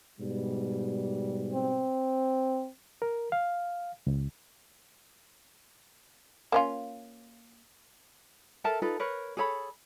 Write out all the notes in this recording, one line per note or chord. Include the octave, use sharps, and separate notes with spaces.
G#2 B2 G3
C4
A#4
F5
C#2
A#3 C#4 F4
A4 A#4 E5 A5
D#4 F4 A4 B4
A#4 B4 C#5
G#4 A4 C#5 B5